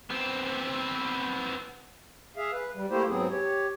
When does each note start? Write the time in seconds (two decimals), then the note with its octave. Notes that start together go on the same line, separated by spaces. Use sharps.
0.10 B3 C4
2.37 G#4 E5 F5
2.52 B4
2.75 G3
2.90 A3 A#3 E4 G4 C5
3.09 G#2 F#3 B3 C4 G#4
3.30 G4 C#5